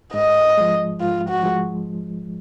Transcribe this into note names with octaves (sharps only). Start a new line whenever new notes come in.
G#2 D#5
F3 G#3
G#2 F4
F#4
F3 G#3